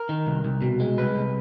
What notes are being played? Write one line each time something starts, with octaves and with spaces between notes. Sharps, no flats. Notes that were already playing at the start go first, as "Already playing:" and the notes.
Already playing: A#4
D#3
C2
C2
B2
G#3
C2 B4
C2